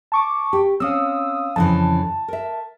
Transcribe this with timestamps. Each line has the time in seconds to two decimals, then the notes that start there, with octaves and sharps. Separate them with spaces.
0.12 A5 C#6 D6
0.53 G4
0.80 C4 C#4 F5 D#6 E6
1.56 F2 C#3 E3 A5
2.28 A#4 E5